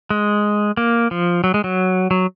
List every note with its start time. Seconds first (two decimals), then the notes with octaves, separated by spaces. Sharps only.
0.10 G#3
0.77 A#3
1.11 F3
1.44 F#3
1.54 G#3
1.64 F#3
2.11 F#3